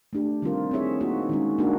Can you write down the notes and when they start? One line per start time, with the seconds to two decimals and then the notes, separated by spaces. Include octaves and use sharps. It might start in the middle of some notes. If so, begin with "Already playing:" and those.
0.13 A3 D4 G4
0.42 D#3 G3 C4 F4 A#4
0.71 C4 E4 G#4 C#5 E5
1.01 A#3 D#4 F#4
1.29 D#3 G#3 C#4
1.58 A#3 D4 F#4